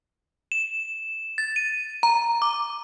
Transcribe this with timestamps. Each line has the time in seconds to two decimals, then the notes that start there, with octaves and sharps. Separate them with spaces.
0.52 E7
1.38 A6
1.56 D#7
2.03 A#5
2.42 D6